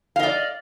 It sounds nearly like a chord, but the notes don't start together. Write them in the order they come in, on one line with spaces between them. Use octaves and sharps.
F5 D#5 D5